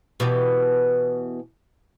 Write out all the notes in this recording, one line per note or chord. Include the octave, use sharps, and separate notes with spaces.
B2 E3 G4